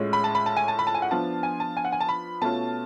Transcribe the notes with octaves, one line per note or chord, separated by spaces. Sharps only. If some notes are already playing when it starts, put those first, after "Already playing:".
Already playing: A2 G#3 C#4 F4
B5
A5
B5
A5
G#5
A5
B5
A5
G#5
F#5
F3 B3 D4 F4 A5
G#5
A5
G#5
F#5
G#5
A5
B5
B2 A3 C#4 F4 A5